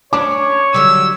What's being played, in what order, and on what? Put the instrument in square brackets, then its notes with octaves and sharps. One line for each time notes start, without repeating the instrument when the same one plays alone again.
[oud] C#4 D4 [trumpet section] C#5 [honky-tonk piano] D6
[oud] D3 F#3 G3 [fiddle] E6